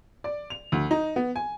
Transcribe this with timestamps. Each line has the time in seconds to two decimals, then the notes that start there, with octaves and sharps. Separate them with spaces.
0.24 D5
0.50 F7
0.72 D2
0.91 D#4
1.16 B3
1.36 G#5